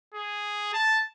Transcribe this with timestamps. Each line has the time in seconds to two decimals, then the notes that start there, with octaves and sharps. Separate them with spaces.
0.14 G#4
0.73 A5